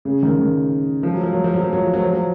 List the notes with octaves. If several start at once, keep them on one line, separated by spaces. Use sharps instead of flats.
C#3
D#3
D#3
F3
F#3
F3
F#3
F3
F#3
F3
F#3
F3
F#3
F3
F#3